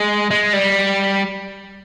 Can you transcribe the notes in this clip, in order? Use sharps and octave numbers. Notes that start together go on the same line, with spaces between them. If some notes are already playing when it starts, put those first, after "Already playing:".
Already playing: G#3
G#3
G3